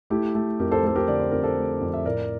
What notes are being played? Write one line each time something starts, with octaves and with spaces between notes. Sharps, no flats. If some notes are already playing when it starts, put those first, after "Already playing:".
A3 E4 G4
A3
F2 G4 A#4
A4 C5
A3 A4
G4 A#4
D3 D5
C5
F2 A#4
A4 C5
A3
F2
E5
A2 A#4 D5